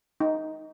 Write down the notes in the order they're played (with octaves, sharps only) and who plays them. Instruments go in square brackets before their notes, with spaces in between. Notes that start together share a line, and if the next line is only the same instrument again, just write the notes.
[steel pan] D#4